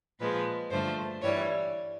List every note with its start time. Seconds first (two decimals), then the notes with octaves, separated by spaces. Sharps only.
0.20 A#2 F3 G#3 B4
0.71 G2 D3 F3 A3 C5
1.22 G2 E3 G3 C#5